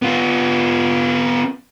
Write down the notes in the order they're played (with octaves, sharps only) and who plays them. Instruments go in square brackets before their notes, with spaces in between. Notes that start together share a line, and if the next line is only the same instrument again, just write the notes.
[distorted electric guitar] B3 F4